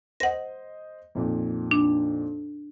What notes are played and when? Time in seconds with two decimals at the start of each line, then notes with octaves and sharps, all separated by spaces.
0.20 C5 D#5 F#5 A#6
1.15 F2 A#2 D#4
1.71 D4